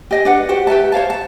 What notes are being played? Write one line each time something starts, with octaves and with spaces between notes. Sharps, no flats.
G4 D#5 G#5
D4 B4 F#5
F#4 G4 C5 F#5
G4 B4 E5 A5
C5 C#5 F5 A5
A5